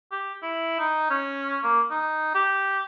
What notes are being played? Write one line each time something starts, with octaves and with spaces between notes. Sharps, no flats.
G4
E4
D#4
C#4
A#3
D#4
G4